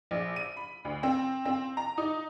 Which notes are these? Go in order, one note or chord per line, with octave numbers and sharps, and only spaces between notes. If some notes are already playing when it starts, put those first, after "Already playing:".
A#1
D#7
B5
D2
C4
C4
A#5
D#4